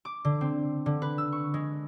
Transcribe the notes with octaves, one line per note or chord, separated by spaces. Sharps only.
D6
D3
C4
D3
B4
E6
C#6
G#3